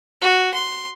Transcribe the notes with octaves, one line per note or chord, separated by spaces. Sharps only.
F#4
C6